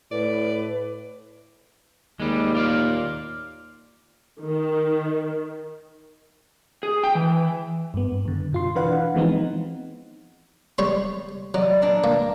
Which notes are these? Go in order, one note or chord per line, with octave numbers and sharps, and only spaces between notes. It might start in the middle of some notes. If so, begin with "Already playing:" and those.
A2 B4 D5
D#2 G3 G#3
F4 D5 F5
D#3
G#4
G5
E3
G2 B3
F#2 D3
B2 F4 C6
E3 D4 B4 F5 F#5
E3 F3 G#3 B3 C4 D#4
G3 C#5 C6
F#3 D5 D#5
A#2 D4 A#4
A#3